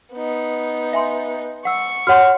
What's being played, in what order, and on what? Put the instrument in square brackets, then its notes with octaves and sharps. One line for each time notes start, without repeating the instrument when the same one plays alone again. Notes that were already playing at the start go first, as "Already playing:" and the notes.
[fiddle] B3 D#4
[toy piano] E5 G#5 C6
[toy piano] F#5 E6 [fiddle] C#6
[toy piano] F#4 C#5 C6 [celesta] F#5 F6